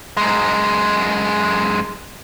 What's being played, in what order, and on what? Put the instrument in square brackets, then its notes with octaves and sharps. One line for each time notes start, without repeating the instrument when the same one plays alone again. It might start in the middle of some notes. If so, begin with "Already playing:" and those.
[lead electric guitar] F#2 G#3